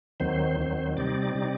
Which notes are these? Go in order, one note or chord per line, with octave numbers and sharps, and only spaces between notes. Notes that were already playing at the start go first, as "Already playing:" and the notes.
D#2 D#3 F#3 C4 C5
D#2 D#3 F#3 C4
C3 G3 C4 D#4 D5
C3 G3 C4 D#4 D5